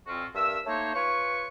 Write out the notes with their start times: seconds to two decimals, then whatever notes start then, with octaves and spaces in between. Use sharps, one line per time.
0.07 F2 A#2 C4 F4 F#4 C#6
0.35 G2 A#4 E5 E6
0.66 A3 A#3 D#4 C5 C#5
0.95 F4 B4 C#5 C#6